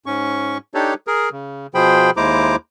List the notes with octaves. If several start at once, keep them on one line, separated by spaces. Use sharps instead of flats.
G#2 C#4 C#6
D4 D#4 G4 A4 C#5
G#4 A#4
C#3
B2 F3 G#4 C5 G5 B5
D#2 G#3 E4 C5 A#5 D6